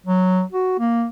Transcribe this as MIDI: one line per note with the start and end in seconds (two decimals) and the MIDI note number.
0.06 0.43 54
0.52 0.76 66
0.79 1.07 58